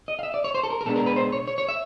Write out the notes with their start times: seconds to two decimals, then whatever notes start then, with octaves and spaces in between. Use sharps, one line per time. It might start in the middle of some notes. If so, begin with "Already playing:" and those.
0.08 D#5
0.19 F5
0.23 E5
0.34 D5
0.44 C#5
0.54 C5
0.63 A4
0.70 A#4
0.81 A#4
0.85 B2 G#3 B3 D4 A4
0.96 A#4
1.06 B4
1.16 C5
1.32 C#5
1.48 C#5
1.58 C#5
1.68 E5